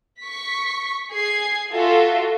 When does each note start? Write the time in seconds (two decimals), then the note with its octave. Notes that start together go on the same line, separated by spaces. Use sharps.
0.23 C#6 B6
1.11 G#4 G#6 C7
1.70 F4 F#4 A4 E5